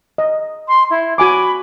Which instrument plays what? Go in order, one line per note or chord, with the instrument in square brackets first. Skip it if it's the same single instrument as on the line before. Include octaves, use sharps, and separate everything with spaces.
[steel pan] D#5
[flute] C6
E4
[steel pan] F#4 G#5 D6 [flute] B5